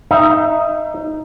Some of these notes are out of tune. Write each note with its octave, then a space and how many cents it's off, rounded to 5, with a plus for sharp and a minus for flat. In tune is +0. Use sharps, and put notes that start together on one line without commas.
D#4 +0 E5 +30